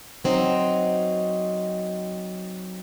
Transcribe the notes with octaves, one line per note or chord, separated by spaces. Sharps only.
F#3 C4 D#4